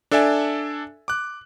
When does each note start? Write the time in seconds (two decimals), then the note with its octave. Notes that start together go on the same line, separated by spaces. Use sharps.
0.11 D4 A4 D5 E5 G#5
1.08 D6 F#6